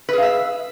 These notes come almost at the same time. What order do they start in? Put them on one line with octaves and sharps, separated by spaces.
B4 G#4 F5 E5